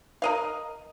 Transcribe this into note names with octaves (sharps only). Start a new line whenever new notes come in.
A#4 D#5 F5